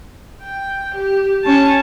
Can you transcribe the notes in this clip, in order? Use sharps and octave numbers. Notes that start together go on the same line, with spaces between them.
G5
G4
C#4 A5